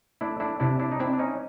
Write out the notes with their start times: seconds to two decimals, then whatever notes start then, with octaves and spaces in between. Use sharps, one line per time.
0.21 A3 D4 E4
0.40 D4 E4
0.60 C3 D4 E4
0.79 D4 E4
0.92 D#4
1.00 C4 D4 E4
1.13 D4
1.19 C#4 D#4